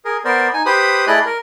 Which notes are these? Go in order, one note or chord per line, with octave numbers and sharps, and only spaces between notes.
G#4 A#4
B3 A#4 C5 D5
D#4 G#5
G4 B4 C5 B5 D#6
A3 E4 G#4 D5 D#5 F#6
A#4